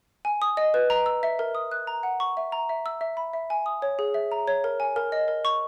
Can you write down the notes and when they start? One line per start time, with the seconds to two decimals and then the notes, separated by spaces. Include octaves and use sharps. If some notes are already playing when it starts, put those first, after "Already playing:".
0.25 G#5
0.42 D#6
0.57 D#5
0.74 B4
0.90 A#5
1.06 E6
1.23 E5
1.39 A#4
1.55 D#6
1.71 F#6
1.87 A#5
2.03 F#5
2.20 C#6
2.37 E5
2.52 A#5
2.69 E5
2.86 E6
3.01 E5
3.17 B5
3.33 E5
3.50 G#5
3.66 D#6
3.82 C#5
3.99 G#4
4.14 E5
4.32 A#5
4.47 C#5
4.64 A#4
4.80 G#5
4.96 A#4
5.12 D#5
5.28 A#4
5.45 C#6